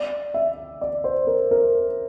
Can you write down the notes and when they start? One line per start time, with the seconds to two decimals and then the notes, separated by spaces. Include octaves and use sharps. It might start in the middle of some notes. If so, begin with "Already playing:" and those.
Already playing: D5
0.34 E5
0.81 D5
1.04 C5
1.27 A#4
1.51 A#4